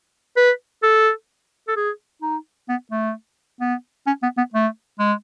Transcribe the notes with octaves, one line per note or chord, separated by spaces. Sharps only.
B4
A4
A4
G#4
D#4
B3
A3
B3
C#4
B3
B3
A3
G#3